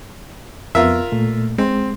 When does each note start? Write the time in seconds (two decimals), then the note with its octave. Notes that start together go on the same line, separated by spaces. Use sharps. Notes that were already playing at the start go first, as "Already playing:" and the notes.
0.75 F2 B3 F4 A#4 E5
1.12 A#2 A3
1.58 G#3 C4